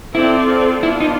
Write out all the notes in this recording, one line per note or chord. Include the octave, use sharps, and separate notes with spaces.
C4 E4 F4 A4 D5
B3 D4 E4 F4
D#4